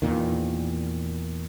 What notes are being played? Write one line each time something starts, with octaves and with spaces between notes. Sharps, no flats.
E2 A#2 D#3